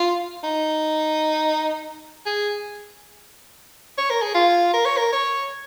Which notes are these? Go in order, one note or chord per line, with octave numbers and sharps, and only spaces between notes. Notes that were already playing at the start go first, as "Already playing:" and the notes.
Already playing: F4
D#4
G#4
C#5
A#4
G#4
F4
A#4
C#5
A#4
C#5